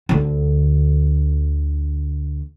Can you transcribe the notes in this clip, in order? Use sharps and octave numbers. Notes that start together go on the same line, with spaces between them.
D2 D3